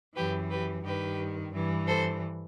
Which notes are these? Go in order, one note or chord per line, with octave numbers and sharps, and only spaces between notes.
F#2 E3 G4 B4
G4 B4
G2 D#3 G4 B4
G2 E3
A4 C5